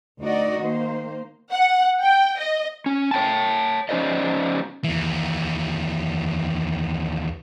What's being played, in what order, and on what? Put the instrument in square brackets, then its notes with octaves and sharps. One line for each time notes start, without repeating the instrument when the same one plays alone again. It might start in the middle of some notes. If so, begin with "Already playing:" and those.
[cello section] D2 D#4 F#4 D5 D#5
D#3 A#3 C5
[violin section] F#5
G5
D#5
[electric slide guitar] C#4
C#5 G5 A5
F3 C#4 D#4 C5 D5 D#5
[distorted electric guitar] D#2 E3